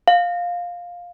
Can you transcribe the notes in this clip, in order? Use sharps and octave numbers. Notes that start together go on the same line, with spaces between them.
F5